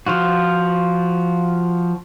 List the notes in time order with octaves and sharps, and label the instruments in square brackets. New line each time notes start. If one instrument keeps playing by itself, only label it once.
[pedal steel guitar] F3 F4 F#4